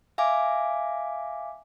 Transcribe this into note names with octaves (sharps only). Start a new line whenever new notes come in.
E5 F5 G#5 D6